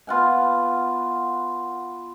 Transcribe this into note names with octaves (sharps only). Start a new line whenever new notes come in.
B3 F4 F#5 G#5